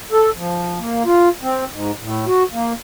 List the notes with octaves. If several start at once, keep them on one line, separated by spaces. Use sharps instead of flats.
A4
F3
A#3
F4
C4
G#2
A2
F#4
A#3